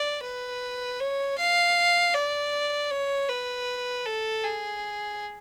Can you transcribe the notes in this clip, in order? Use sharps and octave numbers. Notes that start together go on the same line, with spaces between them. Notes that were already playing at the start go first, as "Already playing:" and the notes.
Already playing: D5
B4
C#5
F5
D5
C#5
B4
A4
G#4